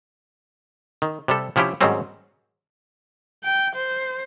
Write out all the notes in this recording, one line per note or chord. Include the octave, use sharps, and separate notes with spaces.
D#3
C3 G3 A4
C3 F3 C#4 E4 G4
G#2 D#3 F#3 G3 C4 C#4
G5
C5